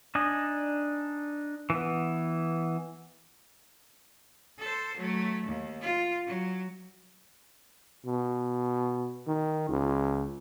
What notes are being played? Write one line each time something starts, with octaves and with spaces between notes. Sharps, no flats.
D4 D#4 D#5 G#5
E3 B3
A4 C5
F#3 A3
D#2
F4
F#3
B2
D#3
C#2